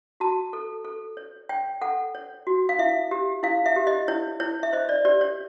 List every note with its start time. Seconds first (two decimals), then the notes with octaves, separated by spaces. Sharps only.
0.20 F#4 A5
0.53 A4
0.85 A4
1.17 C#5
1.49 C#5 G5
1.81 A4 F#5
2.15 C#5
2.47 F#4
2.69 F5
2.79 E4 E5
3.11 G4
3.43 E4 F5
3.66 E5
3.76 G4
3.87 D#5
4.08 E4 C#5
4.40 E4 C#5
4.63 E5
4.73 C5 D#5
4.89 D5
5.05 G4 D5
5.21 C#5